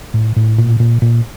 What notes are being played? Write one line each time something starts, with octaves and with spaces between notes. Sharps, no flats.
A2
A2
A#2
A#2
A#2